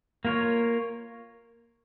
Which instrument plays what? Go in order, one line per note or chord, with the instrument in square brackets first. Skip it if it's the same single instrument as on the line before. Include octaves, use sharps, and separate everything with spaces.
[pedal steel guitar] A#3 F4 A#4 C#5